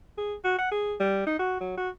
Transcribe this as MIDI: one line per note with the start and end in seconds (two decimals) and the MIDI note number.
0.18 0.35 68
0.44 0.55 66
0.58 0.70 78
0.71 0.94 68
1.00 1.25 55
1.27 1.37 63
1.39 1.60 66
1.60 1.76 54
1.78 1.89 66